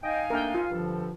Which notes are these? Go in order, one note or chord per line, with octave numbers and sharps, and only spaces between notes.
D#4 D#5 F5 G5 G#5
A3 A#3 D4 A#4 G5
F4
G2 D3 F3 A4